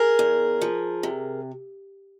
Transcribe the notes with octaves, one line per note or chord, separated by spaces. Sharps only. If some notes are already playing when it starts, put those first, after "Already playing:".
Already playing: G#4 A#4
E2
F3
C3